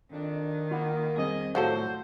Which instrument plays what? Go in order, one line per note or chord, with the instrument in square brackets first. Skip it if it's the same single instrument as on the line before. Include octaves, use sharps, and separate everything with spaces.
[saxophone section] F2 D4 [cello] D#3
[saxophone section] A#3 [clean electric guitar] F4 F#5 B5
[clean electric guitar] F2 G3 C4 [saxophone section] G#4 D#5
[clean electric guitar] C2 A2 F#5 [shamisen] F3 F#3 A4 [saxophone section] C5